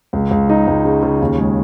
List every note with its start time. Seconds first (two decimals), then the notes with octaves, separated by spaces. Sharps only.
0.13 C#2
0.31 C#2
0.49 D#4
0.67 C#2
0.85 C#3
1.03 C#3
1.21 D#2
1.38 G#3